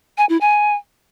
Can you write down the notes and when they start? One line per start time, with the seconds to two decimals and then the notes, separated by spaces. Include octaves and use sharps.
0.17 G#5
0.29 E4
0.41 G#5